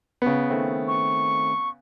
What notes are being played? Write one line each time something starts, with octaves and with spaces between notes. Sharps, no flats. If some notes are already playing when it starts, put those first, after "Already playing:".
C#3 B3
D#3 A3 C4
C#6